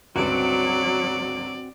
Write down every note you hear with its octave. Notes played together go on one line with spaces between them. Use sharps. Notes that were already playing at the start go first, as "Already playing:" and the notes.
G1 C#2 F#3 C4 F#4 D5